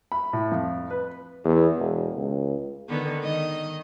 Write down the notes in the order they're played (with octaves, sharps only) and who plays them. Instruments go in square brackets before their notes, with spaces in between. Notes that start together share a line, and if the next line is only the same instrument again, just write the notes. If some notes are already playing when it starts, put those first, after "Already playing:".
[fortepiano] B5
A2
F2
B4
[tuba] E2
E1
C#2
[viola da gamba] D3 D#3 B3
D#3 D#5